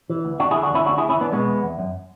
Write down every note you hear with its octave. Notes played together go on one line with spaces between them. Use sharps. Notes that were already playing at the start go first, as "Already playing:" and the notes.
E3
D2
E2 D4 F#4
E4 G#4
D3
D4 F#4
E2 C#4 E4
D2 D4 F#4
E4 G#4
D2
C#4 E4
E3 B3 D4
B2 G#3 B3
E2
E2
F#2